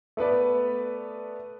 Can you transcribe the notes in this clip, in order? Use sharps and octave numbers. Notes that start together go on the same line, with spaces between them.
A3 B3 B4 D5